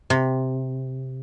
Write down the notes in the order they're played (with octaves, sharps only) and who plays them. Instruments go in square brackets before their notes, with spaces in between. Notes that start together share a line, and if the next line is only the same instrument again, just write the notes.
[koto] C3